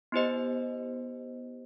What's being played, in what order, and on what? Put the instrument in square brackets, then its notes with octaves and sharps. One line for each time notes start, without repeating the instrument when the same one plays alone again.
[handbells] B3 E4 G4 C5 D#5